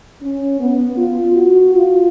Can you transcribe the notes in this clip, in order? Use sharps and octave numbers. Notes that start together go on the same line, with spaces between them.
C#4
B3
F4
F#4
F4